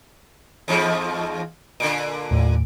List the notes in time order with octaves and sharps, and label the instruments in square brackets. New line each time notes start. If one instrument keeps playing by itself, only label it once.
[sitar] E2 G#2 F3
[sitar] A#2 D3 [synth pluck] D7
[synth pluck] D#2 A2